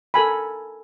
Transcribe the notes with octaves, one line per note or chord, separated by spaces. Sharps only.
A4 A#4 G#5 B5